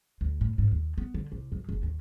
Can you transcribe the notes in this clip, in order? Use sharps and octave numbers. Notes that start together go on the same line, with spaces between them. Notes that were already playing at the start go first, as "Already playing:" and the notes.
D2
A2
G#2
D#2
B3
D3
C2
F#2
F#1
D#2